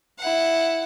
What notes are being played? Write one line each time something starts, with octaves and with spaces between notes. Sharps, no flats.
E4 F#5